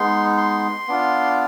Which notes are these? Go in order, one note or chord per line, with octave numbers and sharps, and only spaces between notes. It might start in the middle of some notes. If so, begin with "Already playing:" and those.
Already playing: G#3 B3 D#4 C6
C6
B3 D4 F4